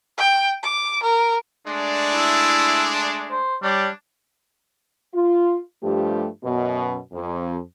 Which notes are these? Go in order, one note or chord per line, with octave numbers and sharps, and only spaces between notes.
G5
D6
A#4
G#3 A3 D4
E4
C5
G3 D4 C#5
F4
G2 F3 A3 G4
F#2 B2
F2